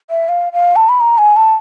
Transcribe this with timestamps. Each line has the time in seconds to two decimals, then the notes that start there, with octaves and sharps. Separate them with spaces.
0.10 E5
0.29 F5
0.53 F5
0.76 A5
0.89 B5
1.00 A#5
1.18 G#5
1.36 A5